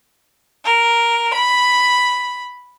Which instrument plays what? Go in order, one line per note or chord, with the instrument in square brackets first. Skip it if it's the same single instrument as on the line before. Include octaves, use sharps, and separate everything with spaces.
[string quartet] A#4
B5